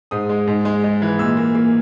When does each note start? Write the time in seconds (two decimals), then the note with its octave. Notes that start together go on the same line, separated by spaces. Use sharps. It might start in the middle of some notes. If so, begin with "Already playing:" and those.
0.11 G#2 D#6
0.29 G#3
0.47 G#2
0.65 G#3
0.84 G#3
1.02 E3
1.19 A#2 E6
1.37 A#3
1.55 A#3